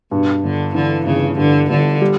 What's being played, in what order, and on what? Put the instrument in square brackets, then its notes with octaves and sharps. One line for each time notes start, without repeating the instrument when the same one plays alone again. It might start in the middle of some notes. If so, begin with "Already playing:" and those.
[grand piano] G2 [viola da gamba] B2
[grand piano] G1 [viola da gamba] D3
[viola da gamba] D3 [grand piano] E3
[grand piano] G1 [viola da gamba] C#3
[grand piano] G2 [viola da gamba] D3
[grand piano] G1 [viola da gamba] D3
[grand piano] G3